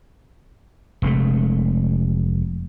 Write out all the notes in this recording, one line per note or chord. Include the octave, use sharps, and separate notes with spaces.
F1 G#3 A3